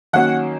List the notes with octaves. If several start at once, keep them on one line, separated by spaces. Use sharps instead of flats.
D#3 F#3 A#3 C#4 F#5